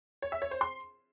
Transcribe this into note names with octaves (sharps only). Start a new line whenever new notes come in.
C#5
E5
C#5
C5
C6